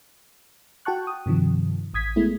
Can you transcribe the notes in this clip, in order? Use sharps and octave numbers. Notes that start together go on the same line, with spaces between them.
F#4 G5 A5 C#6 F#6
D#6
G2 C3 D#3 F3
A1 D#6 G#6 B6
G#3 A3 B3 E4